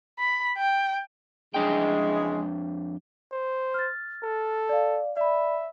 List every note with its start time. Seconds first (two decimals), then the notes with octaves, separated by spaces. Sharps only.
0.19 B5
0.58 G5
1.54 F2 C#3 E3 G#3 D4 G5
3.32 C5
3.74 F6 A6
4.23 A4
4.69 D5 F5
5.17 D5 E5 B5